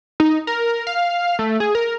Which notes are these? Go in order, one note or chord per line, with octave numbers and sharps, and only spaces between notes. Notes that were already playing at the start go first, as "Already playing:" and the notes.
D#4
A#4
F5
A3
G#4
A#4